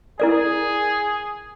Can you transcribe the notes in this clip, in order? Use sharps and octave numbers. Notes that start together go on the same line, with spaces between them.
E4 G#4 A#4 D5